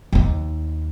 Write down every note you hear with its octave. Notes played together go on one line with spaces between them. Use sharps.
D#2 D#4